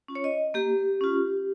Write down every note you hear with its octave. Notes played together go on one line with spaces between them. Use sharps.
C#4 F4
C#5
D#5
A#3 G4
C#4 F4